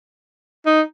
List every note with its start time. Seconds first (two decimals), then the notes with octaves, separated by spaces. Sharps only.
0.66 D#4